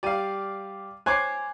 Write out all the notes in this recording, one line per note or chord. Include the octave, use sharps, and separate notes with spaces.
G3 G4 D5 F5 D#7
C5 C#5 G#5 D6 F#6 C7